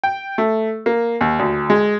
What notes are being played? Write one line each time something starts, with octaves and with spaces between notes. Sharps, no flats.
G5
A3
A#3
D#2
D2
G#3